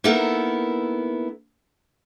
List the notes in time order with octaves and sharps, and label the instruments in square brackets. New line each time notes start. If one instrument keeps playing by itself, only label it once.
[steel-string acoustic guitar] A#3 B3 D#4 E4 A4 A#4